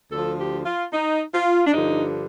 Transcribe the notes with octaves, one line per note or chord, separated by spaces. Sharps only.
D2 D3 F3 A4
G4
F4
D#4
F4
D4
G2 D3 F3 D#4